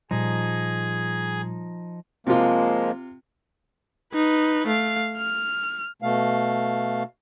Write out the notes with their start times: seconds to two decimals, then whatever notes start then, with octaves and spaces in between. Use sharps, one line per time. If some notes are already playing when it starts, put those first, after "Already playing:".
0.11 A#2 F3 G3 D#4 G#4
2.27 C3 F3 G#3 A#3 F4
4.13 D#4 B4
4.67 A3 F5
5.17 F6
6.02 B2 A3 F5